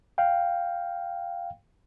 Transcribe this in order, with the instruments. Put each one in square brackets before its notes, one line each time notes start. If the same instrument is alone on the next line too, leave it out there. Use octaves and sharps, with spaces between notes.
[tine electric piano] F5 G5